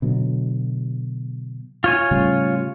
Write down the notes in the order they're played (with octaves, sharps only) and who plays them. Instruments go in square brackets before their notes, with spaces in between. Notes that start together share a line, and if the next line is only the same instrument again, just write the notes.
[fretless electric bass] B2 D3 F#3
[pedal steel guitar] F4 C#5 G#5
[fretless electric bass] A2 C#3 G3